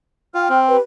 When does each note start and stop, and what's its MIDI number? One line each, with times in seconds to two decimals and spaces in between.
0.34 0.48 65
0.34 0.56 79
0.34 0.56 89
0.49 0.77 60
0.68 0.79 67
0.68 0.79 71